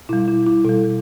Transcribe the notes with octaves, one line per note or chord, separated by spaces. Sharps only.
B2 G3 E4
E4
E4
B2 G3 A4